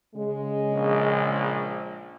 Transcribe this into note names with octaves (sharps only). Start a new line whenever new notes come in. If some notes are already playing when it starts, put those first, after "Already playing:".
C#3 G#3
A#1